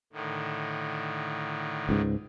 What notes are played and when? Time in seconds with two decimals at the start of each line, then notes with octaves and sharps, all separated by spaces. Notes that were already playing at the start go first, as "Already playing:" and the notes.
0.13 A2 D3 D#3
1.89 C#2 G#2